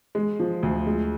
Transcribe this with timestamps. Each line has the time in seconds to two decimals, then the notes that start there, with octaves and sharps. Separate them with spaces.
0.15 G#3
0.39 F3
0.63 D2
0.87 G#3